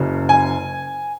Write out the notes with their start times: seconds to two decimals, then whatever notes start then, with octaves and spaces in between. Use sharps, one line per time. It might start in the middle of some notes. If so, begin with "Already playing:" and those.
Already playing: F#1 F#2 C#3
0.29 G#5